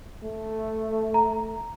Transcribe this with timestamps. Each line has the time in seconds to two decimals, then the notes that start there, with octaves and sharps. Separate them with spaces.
0.23 A3
1.14 A#5